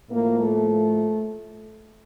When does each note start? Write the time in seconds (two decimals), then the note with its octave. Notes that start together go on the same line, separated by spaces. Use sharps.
0.10 A2 F3 A#3
0.41 A3